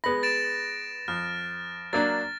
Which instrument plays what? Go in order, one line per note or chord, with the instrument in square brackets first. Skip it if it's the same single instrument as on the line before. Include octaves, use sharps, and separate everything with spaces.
[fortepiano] G#3 B3 B5 [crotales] A#6
[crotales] A6 D7 E7
[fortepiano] F2 [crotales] F6
[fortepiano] F#3 A#3 D4 [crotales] A6